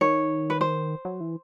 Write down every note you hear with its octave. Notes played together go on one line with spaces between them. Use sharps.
D#3 C#5
B4
C5
F#3
E3